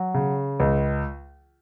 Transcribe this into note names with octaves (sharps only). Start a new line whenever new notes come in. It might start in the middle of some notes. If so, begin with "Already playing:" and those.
Already playing: F#3
C#3
C#2